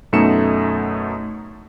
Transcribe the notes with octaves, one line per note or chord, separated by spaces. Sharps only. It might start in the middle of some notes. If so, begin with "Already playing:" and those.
F#2 B2 A3 D#4 C#7 E7